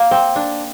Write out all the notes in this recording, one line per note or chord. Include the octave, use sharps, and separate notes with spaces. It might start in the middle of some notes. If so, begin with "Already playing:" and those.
Already playing: A#3
C4
D4